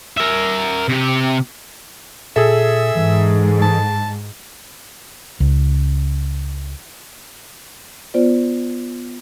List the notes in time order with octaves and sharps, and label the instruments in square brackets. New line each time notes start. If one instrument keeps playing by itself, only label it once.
[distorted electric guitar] A#4 E5
C3 G4
[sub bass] A#2 [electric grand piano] G#4 A4 [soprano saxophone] E5
[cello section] G#2 [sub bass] E3
[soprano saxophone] A5
[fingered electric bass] C#2
[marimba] B3 F4 C5 D5